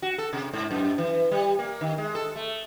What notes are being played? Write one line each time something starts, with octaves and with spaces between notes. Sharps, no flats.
F#4
A4
C3
G#2
F#2
E3
G3
A#3
D#3
G#3
A4
A3